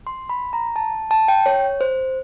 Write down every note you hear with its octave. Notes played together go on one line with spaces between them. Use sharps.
C6
B5
A#5
A5
A5
G5
C#5
C5